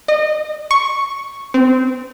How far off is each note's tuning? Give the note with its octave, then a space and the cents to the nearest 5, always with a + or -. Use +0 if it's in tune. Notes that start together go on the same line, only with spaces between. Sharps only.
D#5 -30
C#6 +0
C4 -20